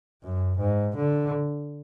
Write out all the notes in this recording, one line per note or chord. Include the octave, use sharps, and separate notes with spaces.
F#2
G#2
D3